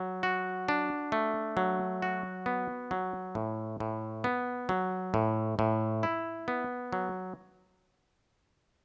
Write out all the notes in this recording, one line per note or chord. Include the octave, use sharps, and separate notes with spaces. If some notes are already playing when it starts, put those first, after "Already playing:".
Already playing: F#3
F#4
D4
A3
F#3
F#4
B3
F#3
A2
A2
B3
F#3
A2
A2
E4
B3
F#3